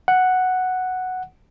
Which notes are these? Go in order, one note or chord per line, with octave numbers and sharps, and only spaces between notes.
F#5